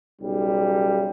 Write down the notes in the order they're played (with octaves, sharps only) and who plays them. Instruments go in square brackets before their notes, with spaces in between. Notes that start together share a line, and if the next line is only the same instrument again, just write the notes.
[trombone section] B1 C#3 G3